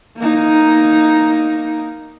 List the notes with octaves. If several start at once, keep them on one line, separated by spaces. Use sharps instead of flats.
A#3 D#4